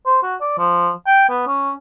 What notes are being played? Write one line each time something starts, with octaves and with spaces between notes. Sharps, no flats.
C5
F#4
D5
F3
G5
B3
C#4